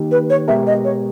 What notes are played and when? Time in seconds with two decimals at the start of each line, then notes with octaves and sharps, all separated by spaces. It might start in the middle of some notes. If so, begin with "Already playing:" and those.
Already playing: D#3 A#3 D#4 G4
0.11 B4
0.30 C#5
0.48 B2 G#3 B3 G4 A#4 E5
0.67 D#5
0.84 C#5